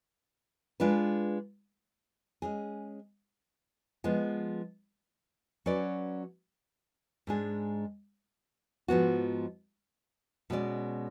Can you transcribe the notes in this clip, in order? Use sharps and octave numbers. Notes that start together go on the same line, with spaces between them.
G#3 D4 F4 B4
G#3 C#4 G#4
F3 G#3 B3
F#3 C#4 F#4 B4 D5
G#2 G#3 D4 G#4
G#2 F3 B3 F#4
B2 G#3 C#4 G#4 D5